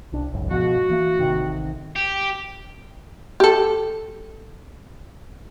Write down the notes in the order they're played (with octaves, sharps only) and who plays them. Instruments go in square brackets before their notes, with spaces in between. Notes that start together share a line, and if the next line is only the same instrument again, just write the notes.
[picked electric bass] C2 D4
G#1 C#2 F#2
[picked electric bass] G#2 B2 F3 [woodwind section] F#4
[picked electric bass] E3 A#3
A1 C3 D#3
[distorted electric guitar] G4
[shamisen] G4 A4